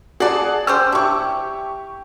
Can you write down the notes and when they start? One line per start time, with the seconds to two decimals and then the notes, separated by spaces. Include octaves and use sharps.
0.20 F3 G#4 D5 F#5 A5
0.67 C#4 G4 C5 E6
0.92 D4 E4 G4 C#6